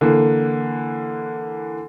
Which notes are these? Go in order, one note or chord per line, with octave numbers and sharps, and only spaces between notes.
D3 E3 A#3